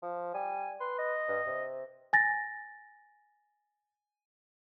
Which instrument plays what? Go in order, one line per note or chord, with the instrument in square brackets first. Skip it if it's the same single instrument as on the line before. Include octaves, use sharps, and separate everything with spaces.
[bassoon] F3
[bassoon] G3 [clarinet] G#5
[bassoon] B4 [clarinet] C6
[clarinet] D#5
[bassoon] G2
C3
[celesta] G#5 A6 A#6